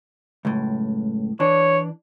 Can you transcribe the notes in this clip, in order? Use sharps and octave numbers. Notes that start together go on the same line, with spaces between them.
C#2 F#2 A2
E3 D4 C#5